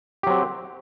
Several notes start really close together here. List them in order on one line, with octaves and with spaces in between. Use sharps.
G4 F#3 C4